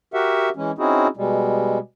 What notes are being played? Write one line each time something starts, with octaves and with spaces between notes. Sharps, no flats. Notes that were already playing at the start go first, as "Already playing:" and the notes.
F#4 G4 A#4 E5 F#5
E3 G#3 C#4
C4 C#4 D#4 E4 F#4 G#4
B2 G3 G#3